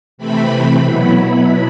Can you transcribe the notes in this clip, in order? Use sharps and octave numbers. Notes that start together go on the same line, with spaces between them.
C3 E3 A3 C4 B5
B2 F#3 B3 E4 B5